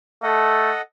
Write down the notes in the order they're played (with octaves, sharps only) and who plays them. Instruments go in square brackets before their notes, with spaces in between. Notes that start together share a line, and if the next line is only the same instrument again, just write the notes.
[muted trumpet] A3 [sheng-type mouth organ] A4 D#5 F#5